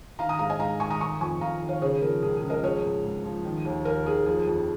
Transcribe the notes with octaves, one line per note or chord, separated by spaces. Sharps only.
D#3 F5 A#5
A#5 D#6
G#2 F5 A#5
D#5 G#5
G#2 F5 A#5
D#3 G#5 C#6
A#5 D#6
D#3 G#5 C#6
F2 G#5 C#6
F2 F5 A#5
D#3
C#5 F5
C#3 G#4 C#5
F3 A#4
C#2 G#4
G#4
C#2
A#4 D#5
F3 G#4 C#5
G#2
G#2
F3
D#3
D#2
D#2 A#4
D#3 G#4
F3 G#4
F2